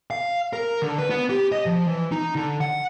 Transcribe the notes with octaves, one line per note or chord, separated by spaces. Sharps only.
F5
A#4
D3
B4
B3
G4
D#5
F3
E3
D#4
D3
F#5